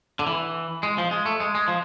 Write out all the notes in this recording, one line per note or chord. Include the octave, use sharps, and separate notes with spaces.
D3
E3
G#3
F3
G#3
A3
G#3
G#3
F3